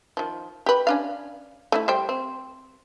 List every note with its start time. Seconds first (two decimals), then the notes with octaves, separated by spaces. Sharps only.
0.17 D#3 F3
0.66 G4 B4
0.87 C#4 D4 F5
1.72 A3 C#4 E4
1.88 G3 C5 G5
2.09 C4